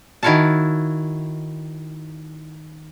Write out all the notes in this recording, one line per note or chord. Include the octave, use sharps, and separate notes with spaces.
D#3 E4 F#4 C#5 F5 A5